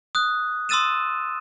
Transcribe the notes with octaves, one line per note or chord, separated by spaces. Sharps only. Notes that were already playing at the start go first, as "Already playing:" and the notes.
D#6 F#6
C6 D#6 E6 A6 D#7 E7